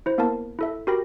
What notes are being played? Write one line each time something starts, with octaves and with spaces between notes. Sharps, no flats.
E4 C5
A#3 B3 E4 A#4 F5 A5
E4 A4 E5
F#4 G4 A#4 G5 B5 A#6